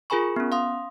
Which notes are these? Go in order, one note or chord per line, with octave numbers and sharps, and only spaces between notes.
F4 G#4 A#4 G#5 B5 C#6
B3 C#4
F5 C6 D#6